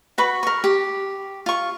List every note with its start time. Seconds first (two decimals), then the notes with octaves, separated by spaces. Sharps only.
0.18 F#4 B4 B5 C#6
0.43 A#4 C#6
0.64 G4
1.46 F4 C#6